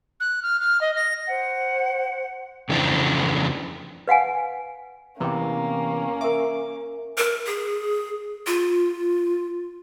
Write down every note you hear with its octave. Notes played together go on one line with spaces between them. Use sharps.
F#6
F6
F6
D#5
A#6
C5 F#5
F2 C#3 E3 D4 C5 G5
B4 F5 F#5 G#5
E2 C3 E3 A#3 C#4 G5 A#5
A#4 E5 D6
A#4
G#4
F4